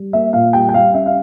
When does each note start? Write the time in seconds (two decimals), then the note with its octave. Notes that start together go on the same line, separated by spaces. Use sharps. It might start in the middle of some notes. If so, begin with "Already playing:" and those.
Already playing: G3
0.13 A#3 E5
0.33 A#2 F5
0.53 G3 G5
0.69 G5
0.74 G3 F5
0.94 C#4 E5
1.06 F5